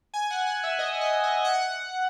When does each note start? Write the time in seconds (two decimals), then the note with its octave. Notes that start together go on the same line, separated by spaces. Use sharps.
0.14 G#5
0.30 F#5
0.47 F#5
0.63 E5
0.79 D#5
1.01 D#5
1.24 D#5
1.45 F#5